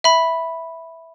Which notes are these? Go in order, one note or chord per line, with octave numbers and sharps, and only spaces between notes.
E5 B5